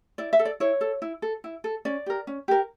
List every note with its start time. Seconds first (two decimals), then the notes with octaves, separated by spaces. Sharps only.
0.18 E4 D5
0.33 E5
0.39 A4
0.45 D5
0.60 E4 C#5
0.81 A4
1.02 E4
1.22 A4
1.44 E4
1.64 A4
1.85 C#4 D5
2.06 G4 A#4
2.27 C#4
2.48 G4 A#4